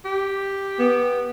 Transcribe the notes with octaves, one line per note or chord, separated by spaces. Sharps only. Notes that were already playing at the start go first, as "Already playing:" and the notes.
G4
B3